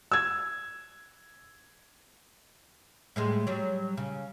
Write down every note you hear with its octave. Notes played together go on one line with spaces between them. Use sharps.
E6 G#6
A2 G3 G#3
F#3 G3
C#3